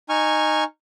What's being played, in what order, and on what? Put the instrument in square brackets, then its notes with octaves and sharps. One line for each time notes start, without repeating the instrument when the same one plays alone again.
[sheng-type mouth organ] D#4 G#5 C#6 F6